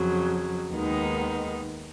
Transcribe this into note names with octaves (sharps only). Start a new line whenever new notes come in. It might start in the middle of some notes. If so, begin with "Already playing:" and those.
Already playing: F2 C#3 F#3
D#2 D#3 G#3 B3 D#4